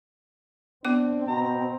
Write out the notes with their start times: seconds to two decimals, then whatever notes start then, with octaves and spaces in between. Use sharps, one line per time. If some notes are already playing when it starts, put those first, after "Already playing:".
0.85 B3 C4 D4 D6
1.28 B2 A#5